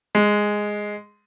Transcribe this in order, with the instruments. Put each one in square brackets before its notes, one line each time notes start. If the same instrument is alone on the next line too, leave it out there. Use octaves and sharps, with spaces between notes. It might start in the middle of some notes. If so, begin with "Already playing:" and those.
[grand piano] G#3